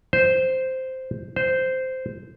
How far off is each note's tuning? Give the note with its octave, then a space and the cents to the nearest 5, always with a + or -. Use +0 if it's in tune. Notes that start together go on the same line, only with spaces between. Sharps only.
C5 -5
C5 -10